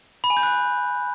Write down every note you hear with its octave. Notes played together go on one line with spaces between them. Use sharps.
B5
G#5
G6
F#6